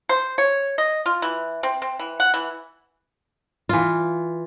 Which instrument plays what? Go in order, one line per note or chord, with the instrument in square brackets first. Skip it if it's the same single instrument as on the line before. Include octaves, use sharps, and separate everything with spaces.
[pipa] C5
C#5
D#5
F4
E3
C4
C4
E3
F#5
E3
[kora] E3 F4